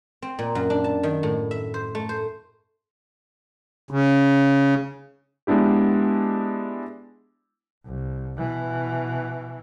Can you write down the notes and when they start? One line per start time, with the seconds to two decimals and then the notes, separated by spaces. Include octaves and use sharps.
0.22 C4
0.39 A#2
0.55 F#2
0.70 D4
0.84 A5
1.03 D#3
1.23 A2
1.51 E5
1.74 C5
1.95 A3
2.09 C5
3.91 C#3
5.47 G#3 B3 D4 E4 G4
7.86 C2
8.37 B2 E3